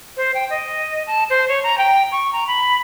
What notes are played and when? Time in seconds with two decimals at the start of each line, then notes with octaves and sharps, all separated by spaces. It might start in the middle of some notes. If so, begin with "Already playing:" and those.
0.17 C5
0.34 G5
0.50 D#5
1.07 A5
1.30 C5
1.48 C#5
1.63 A#5
1.78 G5
2.12 C#6
2.33 A#5
2.48 B5